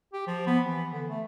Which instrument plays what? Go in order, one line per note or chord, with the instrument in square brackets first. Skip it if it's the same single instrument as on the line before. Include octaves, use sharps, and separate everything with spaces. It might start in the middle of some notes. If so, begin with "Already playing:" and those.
[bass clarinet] G4
F3
B3
E3
D3
A3